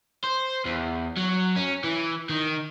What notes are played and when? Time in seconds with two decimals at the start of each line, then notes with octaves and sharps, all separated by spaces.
0.24 C5
0.66 E2
1.17 F#3
1.57 C#4
1.84 E3
2.29 D#3